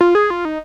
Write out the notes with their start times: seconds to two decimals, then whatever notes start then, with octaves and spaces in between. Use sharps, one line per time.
0.01 F4
0.15 G#4
0.30 F4
0.45 D#4